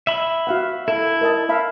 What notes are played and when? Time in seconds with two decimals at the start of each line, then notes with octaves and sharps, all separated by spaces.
0.07 E5 B5
0.47 F#4 F5 F#5
0.88 E4 A4
1.21 A#4 D#5 A5
1.49 E5 F5 B5